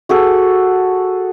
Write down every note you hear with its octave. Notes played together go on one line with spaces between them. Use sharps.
F#4 G#4 A4